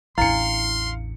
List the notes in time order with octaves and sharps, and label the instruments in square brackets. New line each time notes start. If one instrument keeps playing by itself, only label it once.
[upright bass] A1 E2 [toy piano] D4 E4 [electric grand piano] F5 C#7 [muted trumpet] C6